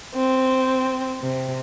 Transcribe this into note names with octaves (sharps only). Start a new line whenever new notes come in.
C4
C3